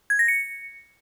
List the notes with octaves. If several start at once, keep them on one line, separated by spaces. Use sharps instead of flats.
G#6
A#6
C#7